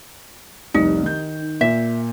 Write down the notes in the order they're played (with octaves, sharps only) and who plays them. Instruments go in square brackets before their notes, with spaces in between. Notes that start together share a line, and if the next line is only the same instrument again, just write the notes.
[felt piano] F1 C2 [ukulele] D#4
[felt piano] D#3 G6
[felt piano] A#2 [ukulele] E5